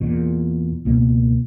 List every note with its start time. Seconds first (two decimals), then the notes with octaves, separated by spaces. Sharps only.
0.01 E2 A#2
0.85 C#2 B2 A#3 B3